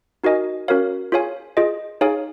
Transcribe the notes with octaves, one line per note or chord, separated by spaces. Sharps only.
D#4 F#4 A#4 D#5 G#5
C#4 F#4 A#4 C#5 F5
F4 G#4 C#5 F5 G#5
F4 G#4 D#5
D#4 G#4 C#5 F5 G#5